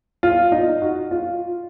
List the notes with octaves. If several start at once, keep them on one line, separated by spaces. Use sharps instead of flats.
F4
D#4
F#4
F4